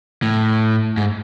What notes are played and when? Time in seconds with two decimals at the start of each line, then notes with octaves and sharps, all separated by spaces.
0.22 A2
0.97 G#2